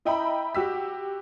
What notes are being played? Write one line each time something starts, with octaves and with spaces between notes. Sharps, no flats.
E4 D#5 E5 G5 A#5 B5
F#4 G4 E6 B6